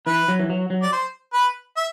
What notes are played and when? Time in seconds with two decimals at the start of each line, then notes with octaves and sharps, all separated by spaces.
0.06 E3 B4
0.28 F#3
0.39 E3
0.50 F#3
0.70 F#3
0.82 D5
0.92 C5
1.33 B4
1.77 E5